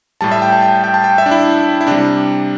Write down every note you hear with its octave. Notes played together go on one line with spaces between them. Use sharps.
A2 G3 A5
E5
G5
A5
G5
G5
A5
G5
E5
D4
E4
E4
C3 G3 D4